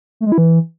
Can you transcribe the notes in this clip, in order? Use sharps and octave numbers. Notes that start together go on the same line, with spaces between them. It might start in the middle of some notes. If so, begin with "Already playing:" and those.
A3
G#3
E4
E3